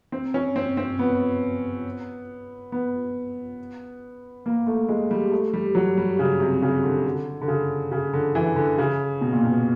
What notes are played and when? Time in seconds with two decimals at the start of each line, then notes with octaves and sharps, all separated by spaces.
0.12 C4
0.34 C#4
0.56 C4
0.77 C4
0.99 B3
2.72 B3
4.46 A#3
4.67 A3
4.89 G#3
5.11 G3
5.32 A3
5.53 G3
5.75 F#3
5.97 G3
6.19 C#3
6.40 C3
6.62 C#3
6.83 D3
7.05 D3
7.41 D3
7.48 C#3
7.92 C#3
8.13 D3
8.35 E3
8.56 D3
8.78 C#3
9.21 B2
9.33 A#2
9.45 B2